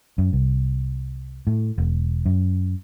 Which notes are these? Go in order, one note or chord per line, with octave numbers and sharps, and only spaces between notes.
F#2
C2
A2
E1
F#2